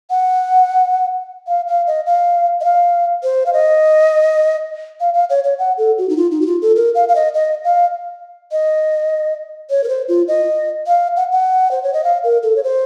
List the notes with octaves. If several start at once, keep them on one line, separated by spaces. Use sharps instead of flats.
F#5
F5
F5
D#5
F5
D#5
F5
C5
F5
D#5
F5
F5
C#5
C#5
F#5
A4
F#4
D#4
F4
D#4
F#4
F4
A4
A#4
F5
F5
D#5
D#5
F5
D#5
C#5
A#4
C5
F4
D#5
F5
F#5
F#5
C5
C#5
D#5
F5
A#4
A4
C#5
C5